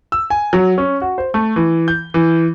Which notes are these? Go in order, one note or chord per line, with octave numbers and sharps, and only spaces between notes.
E6
G#5
F#3
C#4
F#4
C5
A3
E3
G6
E3